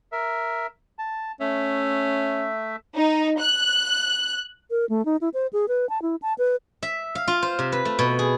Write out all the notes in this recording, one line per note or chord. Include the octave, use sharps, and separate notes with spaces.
A#4 E5
A5
A3 C#4 E5
D#4
F#6
A#4
A3
D#4
E4
C5
G#4
B4
A5
E4
A5
B4
E5
F5
F4
C5
C3
B4
A3
B2
G#4